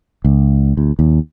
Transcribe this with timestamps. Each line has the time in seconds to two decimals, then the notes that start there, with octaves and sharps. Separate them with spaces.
0.25 C#2
0.77 D2
0.99 D#2